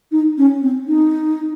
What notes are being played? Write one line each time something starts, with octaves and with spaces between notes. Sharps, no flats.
D#4
C#4
C4
D#4